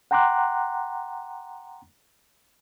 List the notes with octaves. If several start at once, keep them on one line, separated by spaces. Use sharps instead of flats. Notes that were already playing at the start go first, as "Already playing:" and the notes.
F#5 G5 A#5 C6 D6 F#6